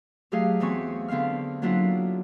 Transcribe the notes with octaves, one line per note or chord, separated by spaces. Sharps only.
F#3 A3 D#4 G4 G#4 F5
E2 E3 B3 C4 G#5 C#6
D3 B3 C4 F5 F6
F#3 A#3 B3 D4 E4 F4